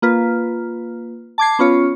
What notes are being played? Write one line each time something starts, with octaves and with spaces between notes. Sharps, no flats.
A#3 F4 B4
A5 D6 G#6 C7
B3 C#4 F4 C#5